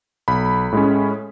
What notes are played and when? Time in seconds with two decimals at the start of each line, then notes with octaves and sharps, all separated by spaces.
0.28 B1 B5
0.72 A2 G#3 C#4